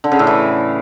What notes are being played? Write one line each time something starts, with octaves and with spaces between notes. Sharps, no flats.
D3
C#3
A2
E3